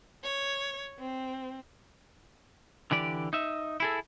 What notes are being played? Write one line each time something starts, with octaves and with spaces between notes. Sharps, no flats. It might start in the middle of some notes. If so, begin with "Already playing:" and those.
C#5
C4
D3 E3 G4 D5
D#4 E5
E4 G#4 A4